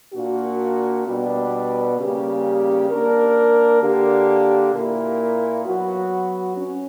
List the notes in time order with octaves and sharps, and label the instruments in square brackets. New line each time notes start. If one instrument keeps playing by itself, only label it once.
[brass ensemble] A#2 A#3 D4 F#4
B2 G3 B3 D4
C#3 G3 A#3 C#4 G4
A#3 D4 A#4
D3 A#3 D4 G4
A#2 A#3 E4 A#4
F#3 B3 F#4
C#4